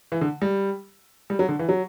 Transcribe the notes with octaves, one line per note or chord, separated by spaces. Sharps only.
E3
D3
G3
G3
F#3
D3
E3
F#3